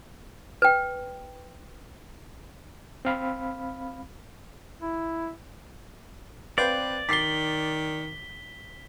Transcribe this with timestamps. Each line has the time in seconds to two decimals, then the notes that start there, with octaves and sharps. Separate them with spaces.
0.62 B4 G5
3.05 C4 F5 B5
4.80 E4
6.58 C4 B4 D5 F5 G6
7.09 D#3 D6 A6 B6 C7 G7